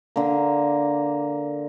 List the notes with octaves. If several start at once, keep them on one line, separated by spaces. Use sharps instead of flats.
D3 A#3